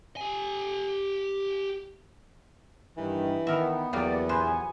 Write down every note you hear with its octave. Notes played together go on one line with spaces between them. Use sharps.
G4 G#5
G2 D#3 E3
D#3 B3 A#4 E5
E2 F#3 A#3 F#4 G4 D5
A#1 B4 C5 G#5